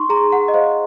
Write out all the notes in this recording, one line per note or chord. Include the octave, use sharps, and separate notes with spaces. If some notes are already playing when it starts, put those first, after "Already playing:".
Already playing: D#4 C6 C#6
G#4 A#5
F#5
D#5
C5 F5